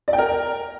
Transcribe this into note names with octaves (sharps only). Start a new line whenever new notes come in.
D5
G5
A#4